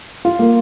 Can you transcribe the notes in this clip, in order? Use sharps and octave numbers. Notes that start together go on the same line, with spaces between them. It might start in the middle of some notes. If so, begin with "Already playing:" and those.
F4
A#3